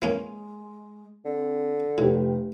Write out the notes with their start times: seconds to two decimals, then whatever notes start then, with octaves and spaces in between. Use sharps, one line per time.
0.02 E3 G#3 A#3 C#4
1.25 D3 C4
1.98 F1 A2 G4 B4